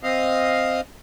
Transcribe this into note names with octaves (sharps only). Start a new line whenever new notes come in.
C4 D#5 F5